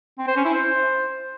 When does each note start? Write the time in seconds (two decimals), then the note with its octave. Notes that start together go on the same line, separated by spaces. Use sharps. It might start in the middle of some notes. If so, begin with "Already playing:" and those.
0.19 C4
0.27 C5
0.36 C#4
0.45 E4
0.54 C5